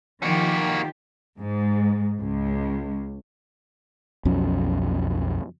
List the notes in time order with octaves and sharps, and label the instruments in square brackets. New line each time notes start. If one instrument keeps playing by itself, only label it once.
[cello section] D#3 F3 G4 [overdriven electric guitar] A#3 F#4
[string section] G#2
C#2
[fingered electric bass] B1 F2 F#3 C#4